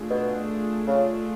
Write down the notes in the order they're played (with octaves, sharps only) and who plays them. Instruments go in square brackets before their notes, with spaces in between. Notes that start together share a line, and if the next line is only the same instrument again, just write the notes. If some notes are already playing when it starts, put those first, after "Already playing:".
Already playing: [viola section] A3 D4 F4 G#4
[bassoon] B2
C#3